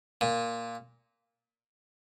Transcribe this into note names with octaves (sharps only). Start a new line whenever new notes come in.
A#2